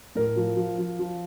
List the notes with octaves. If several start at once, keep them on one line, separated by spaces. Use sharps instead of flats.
A2 A#4
F3
F3
F3
F3